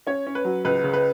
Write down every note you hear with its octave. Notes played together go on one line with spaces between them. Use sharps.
C#4 C#5
C#4
B4
F#3
C#2 B4
C#3
B4